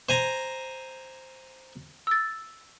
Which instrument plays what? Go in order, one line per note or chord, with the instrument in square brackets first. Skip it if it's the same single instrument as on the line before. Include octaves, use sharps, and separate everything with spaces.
[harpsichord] C5 G#5 A#5
[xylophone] E6 A6